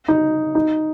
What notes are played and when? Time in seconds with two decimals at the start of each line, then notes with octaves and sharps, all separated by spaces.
0.08 D#4
0.55 D#4